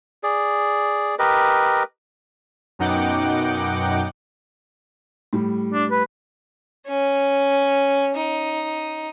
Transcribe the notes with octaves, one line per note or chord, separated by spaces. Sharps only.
G#4 D5
G4 A#4 B4 D#5
F#2 B2 D#4 F#5 G5 D6
A2 G3
D4
B4
C#4
D#4